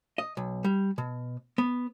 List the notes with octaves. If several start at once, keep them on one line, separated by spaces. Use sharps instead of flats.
D#5
B1
G3
B2
B3